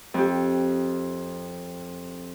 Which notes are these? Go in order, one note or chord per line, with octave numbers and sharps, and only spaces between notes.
F2 G4